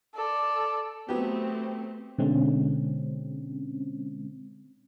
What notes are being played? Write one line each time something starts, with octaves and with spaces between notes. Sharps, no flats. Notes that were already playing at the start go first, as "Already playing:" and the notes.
A4 D5
F#3 A3 B3 C4 G4
B2 D3 G#3 C4 C#4